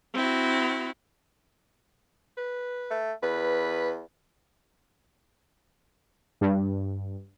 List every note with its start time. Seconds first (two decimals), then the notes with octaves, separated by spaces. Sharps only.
0.15 C4 E4 F#4
2.37 B4
2.91 A3
3.23 E2 B4
6.41 G2